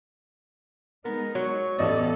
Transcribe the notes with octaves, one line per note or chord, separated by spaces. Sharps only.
G#3 B3 D#4 A#4
F#3 C#5
A1 B3 A4 D5 D#5